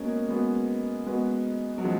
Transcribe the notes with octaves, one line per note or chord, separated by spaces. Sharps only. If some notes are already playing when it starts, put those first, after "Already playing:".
Already playing: G#3 A#3 B3 C#4 F#4 D#5
G#3 B3 F#4 B4 D#5
G#3 B3 F#4 B4 D#5
F#3
C#3 F3 G#3